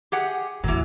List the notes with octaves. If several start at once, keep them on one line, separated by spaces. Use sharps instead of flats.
G4 G#4 F#5
D#2 A2 E3 F#3